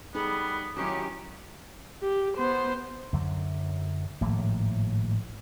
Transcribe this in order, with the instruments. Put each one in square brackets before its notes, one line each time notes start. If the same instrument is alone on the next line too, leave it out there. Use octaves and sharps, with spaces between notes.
[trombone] G3 [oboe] B3 [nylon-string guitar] D#4 G#4 A4
[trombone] D#3 [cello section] F#3 C#4 G4 [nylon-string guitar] E4 F#4
[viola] G4
B3 C5
[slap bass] F#2 D3 F#3
G#1 A2 F3 A#3